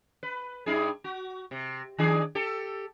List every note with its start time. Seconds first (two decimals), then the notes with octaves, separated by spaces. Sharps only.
0.23 B4
0.66 G2 D#4 G#4
1.04 F#4
1.51 C3
1.99 D#3 D4 G#4
2.35 G4 A4